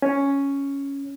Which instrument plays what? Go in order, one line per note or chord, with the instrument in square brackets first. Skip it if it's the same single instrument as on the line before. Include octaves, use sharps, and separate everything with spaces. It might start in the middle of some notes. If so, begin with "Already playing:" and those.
[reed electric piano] C#4